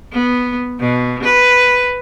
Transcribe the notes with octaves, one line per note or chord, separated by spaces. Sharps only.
B3
B2
B4